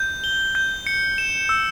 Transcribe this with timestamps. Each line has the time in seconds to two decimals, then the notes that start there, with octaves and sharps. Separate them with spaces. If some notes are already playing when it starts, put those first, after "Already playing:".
Already playing: G6
0.24 G7
0.55 G6
0.87 C#7
1.18 E7
1.49 E6